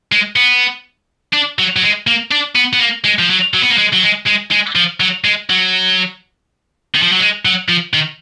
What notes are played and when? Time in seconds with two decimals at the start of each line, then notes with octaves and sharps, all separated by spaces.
0.12 G#3
0.36 B3
1.34 D4
1.59 F#3
1.76 F#3
1.83 G#3
2.07 A#3
2.31 D4
2.56 B3
2.73 B3
2.80 A#3
3.04 G#3
3.19 F3
3.30 F#3
3.54 F#3
3.62 B3
3.71 A#3
3.78 G#3
3.93 F#3
4.03 G#3
4.27 G#3
4.51 G#3
4.76 F3
5.00 F#3
5.25 G#3
5.50 F#3
6.95 D#3
7.03 F3
7.12 F#3
7.20 G#3
7.45 F#3
7.69 F3
7.94 D#3